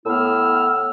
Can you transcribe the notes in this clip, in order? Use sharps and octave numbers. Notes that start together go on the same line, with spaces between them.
A2 B3 E4 E6 F6